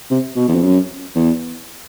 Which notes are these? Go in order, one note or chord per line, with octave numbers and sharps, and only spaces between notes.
C3
B2
E2
F2
F#2
E2